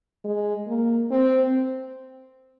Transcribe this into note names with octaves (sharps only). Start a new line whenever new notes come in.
G#3
A#3
C4